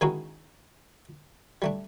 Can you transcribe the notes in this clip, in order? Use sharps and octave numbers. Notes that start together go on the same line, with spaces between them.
D#3 G#3 C#4 D#4 E4 F#4
G3 A3 D4